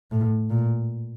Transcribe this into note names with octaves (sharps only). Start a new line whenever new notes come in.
A2
A#2